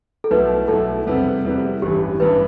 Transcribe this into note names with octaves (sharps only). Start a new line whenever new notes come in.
A4
B1 B2 A3 E4 B4
B1 B2 A3 E4 A4
E2 C3 G3 B3 E4
E2 C3 G3 B3 E4
A1 G2 E3 G4
A1 G2 E3 B4